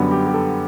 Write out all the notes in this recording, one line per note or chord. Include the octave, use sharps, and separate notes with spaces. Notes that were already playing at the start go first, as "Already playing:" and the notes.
Already playing: F#2 D3 G3 B3
G4
G4
A4